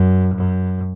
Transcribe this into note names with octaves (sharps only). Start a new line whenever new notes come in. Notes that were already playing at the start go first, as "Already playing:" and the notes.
Already playing: F#2
F#2